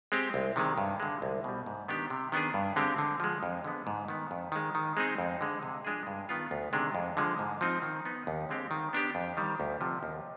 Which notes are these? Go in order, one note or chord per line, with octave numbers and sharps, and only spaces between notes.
G#3 C4 G4
C2
C3 D#3 G#3
G2
D3 G#3
C2
B2 G3
G#2
D#3 B3 D4 G4
C3
D#3 B3 D4 G#4
G2
D3 G#3 C4 G4
D3
F3 G#3
F2
D3 G#3 B3
G#2
D#3 B3
F2
D#3 G#3
D#3
G#3 C4 D#4 G#4
F2
D3 G#3
C3
F3 G#3 D4 G#4
G2
D#3 B3 F4
D2
C3 D#3 G#3 D4
F2
D3 F3 G#3
G#2
F3 C4 D#4
D#3
B3 D#4
D#2
D3 G#3 C4 G4
D#3
B3 D4 G4
F2
D#3 G3
D2
C3 F3
D#2